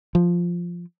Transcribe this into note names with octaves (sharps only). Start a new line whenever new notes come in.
F3